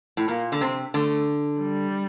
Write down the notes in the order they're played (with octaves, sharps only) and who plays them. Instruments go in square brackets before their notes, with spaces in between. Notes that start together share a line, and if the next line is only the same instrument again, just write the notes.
[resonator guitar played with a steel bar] A2
[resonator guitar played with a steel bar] A#2 [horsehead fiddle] A#3
[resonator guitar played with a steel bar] D3
[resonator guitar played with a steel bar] C3 [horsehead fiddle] C4
[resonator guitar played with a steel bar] D3 [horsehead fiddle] A3
[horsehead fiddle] G3